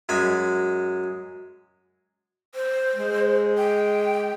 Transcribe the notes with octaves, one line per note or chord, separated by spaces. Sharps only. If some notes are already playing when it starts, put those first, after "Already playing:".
F#2 G#3 B5
C5
G#3
G5